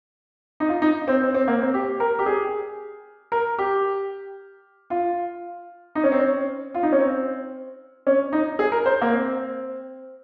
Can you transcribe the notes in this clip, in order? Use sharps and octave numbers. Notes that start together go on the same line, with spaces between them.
D#4
F4
D#4
C4
C4
C4
A#3
C4
G4
A#4
G4
G#4
A#4
G4
F4
D#4
C#4
C4
C#4
F4
D#4
C#4
C4
C#4
D#4
G#4
A#4
C5
A#3
C4